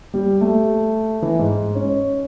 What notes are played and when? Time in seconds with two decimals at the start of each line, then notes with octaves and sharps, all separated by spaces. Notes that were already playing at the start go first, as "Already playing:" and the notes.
0.14 G3
0.41 A3
1.22 E3
1.39 G#2
1.75 C#4